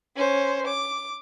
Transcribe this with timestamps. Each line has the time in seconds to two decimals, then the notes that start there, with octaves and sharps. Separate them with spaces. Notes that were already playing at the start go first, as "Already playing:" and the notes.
0.16 C#4 C5
0.67 D6